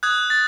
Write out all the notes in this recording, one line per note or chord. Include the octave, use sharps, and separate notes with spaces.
D#6 F#6 G#6
A6